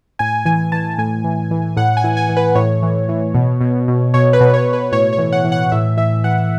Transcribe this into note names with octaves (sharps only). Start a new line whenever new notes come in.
A2 G#5
E3 G#5
E3 A5
A2 G#5
E3
E3
A2 F#5
G#5
E3
G#5
E3
B4
A2 C#5
E3
E3
B2
B2
B2
B2 C#5
B4
B2
C#5
B2
B4
A2 C#5
C#5
E3
F#5
E3
F#5
A2 E5
E3 E5
E3 F#5